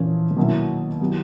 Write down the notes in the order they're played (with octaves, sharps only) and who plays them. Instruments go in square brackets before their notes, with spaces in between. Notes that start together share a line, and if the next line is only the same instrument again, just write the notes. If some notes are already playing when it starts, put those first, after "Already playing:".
Already playing: [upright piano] A#2 F3 A#3 C#4 [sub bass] E3
[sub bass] D3
[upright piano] B2 F#3 A#3 C#4 E4 [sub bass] D#3
[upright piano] F#3 B3 E4 G4